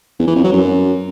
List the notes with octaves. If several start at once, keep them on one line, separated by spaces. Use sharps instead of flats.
E2
E3
F2
F#3
F#2